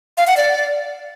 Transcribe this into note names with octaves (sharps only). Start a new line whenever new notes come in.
F5
F#5
D5